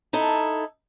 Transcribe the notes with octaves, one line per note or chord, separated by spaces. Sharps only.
D#4 E4 A4